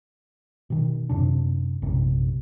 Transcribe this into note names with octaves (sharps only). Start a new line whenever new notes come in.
B2 D#3
F#2 C3 D4
A#1 F#2 C3